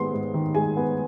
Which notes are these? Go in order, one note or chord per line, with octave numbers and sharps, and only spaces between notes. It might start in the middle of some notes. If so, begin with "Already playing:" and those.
Already playing: G#2 D#3 G#3 B3 C6
G#2
D#3
G#3 G#5
B3